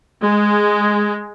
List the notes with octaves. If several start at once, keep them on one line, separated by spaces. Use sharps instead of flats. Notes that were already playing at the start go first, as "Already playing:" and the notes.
G#3